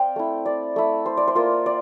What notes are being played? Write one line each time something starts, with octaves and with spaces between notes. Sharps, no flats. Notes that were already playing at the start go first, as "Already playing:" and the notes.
Already playing: C4 D5 F5 G5
A3 E4
D5
A3 E4
C5
D5
C5
A#3 F4
D5